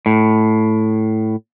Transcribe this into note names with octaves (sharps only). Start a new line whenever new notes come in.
A2